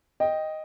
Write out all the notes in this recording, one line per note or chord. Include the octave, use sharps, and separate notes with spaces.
D#5 G5